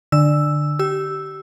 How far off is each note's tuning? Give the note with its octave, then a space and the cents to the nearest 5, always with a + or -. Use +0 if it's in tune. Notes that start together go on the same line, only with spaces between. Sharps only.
D3 +15 E6 +0
G4 -20 E6 +0